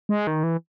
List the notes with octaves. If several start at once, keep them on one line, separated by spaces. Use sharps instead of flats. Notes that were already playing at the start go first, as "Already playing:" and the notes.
G#3
D#3
E3